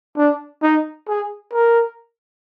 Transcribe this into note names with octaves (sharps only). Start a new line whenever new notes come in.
D4
D#4
G#4
A#4